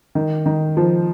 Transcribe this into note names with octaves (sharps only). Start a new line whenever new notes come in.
D#3
D#3
F3